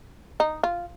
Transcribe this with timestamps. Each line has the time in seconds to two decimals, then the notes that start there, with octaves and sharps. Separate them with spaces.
0.40 D#4
0.63 F4